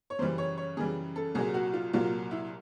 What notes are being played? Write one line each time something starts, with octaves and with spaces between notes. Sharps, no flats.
C#5
F#2 C#3 E3 G3 C5
C#5
C#5
F#2 C#3 E3 G3 G#4
A4
C2 A#2 F#3 G#4
F#4
F4
C2 A#2 F#3 F4
E4